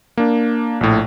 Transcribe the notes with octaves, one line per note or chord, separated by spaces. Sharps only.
A#3 D4
A#1 A2